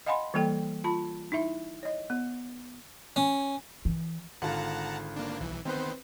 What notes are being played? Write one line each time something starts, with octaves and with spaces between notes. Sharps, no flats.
D#5 F5 F#5 G#5 B5 C6
E3 G3 A#3 A4 G5
F4 A5 B5
D#4 E4 E5
C#5 D#5
B3
C#4
E3
G#1 D3 F4 F#5 A5 A#5
A#3 D4
B1 E3
D#3 B3 C4 B4 C5